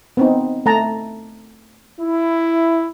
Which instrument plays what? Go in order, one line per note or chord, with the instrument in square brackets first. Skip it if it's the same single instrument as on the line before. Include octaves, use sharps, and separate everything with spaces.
[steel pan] B3 C4 D#4
A3 A5 A#5
[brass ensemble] E4